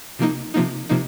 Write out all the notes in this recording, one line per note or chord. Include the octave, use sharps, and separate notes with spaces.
C3 F3 A#3 D#4
C3 F3 A#3 D#4
C3 F3 A#3 D#4